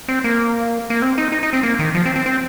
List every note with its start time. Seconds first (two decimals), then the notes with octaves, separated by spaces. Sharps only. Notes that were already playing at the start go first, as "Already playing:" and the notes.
0.08 C4
0.24 A#3
0.90 A#3
1.02 C4
1.18 D#4
1.32 D#4
1.43 D#4
1.53 C4
1.63 A#3
1.79 D#3
1.95 F3
2.05 C4
2.16 C4
2.26 C4